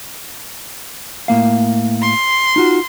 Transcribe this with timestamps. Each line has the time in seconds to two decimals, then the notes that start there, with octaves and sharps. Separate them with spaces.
1.28 A2 A#3 F5
2.01 C6
2.56 D#4 F4 F#4